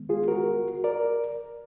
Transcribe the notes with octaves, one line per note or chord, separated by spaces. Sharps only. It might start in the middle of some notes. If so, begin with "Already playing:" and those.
Already playing: D#3 G#3 B3
F4 G#4
F#4 A#4
A#4 D5